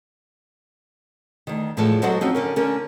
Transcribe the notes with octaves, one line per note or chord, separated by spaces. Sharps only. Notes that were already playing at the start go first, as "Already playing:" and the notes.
D2 D#3
E2 A2 F3 G#3 A4
F#3 F#4 A4 C5 D#5 F#5
F3 C4 C#4 D#4 F#4
D3 C#4 A#4
D3 C#4 A#4